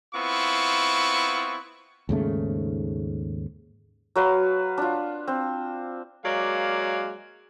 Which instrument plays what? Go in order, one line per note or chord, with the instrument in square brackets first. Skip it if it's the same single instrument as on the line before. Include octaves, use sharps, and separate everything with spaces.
[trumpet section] B3 C4 E4 F4 C#6
[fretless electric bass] D#2 G#2 C#3 A3
[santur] F#3 B4 F5
D4 F4
C4
[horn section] F#3 G#3 A#3 D5 F5